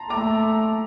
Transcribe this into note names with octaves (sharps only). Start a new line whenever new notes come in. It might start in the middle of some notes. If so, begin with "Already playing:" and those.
Already playing: A5 A#5 C6
A3 A#5 D6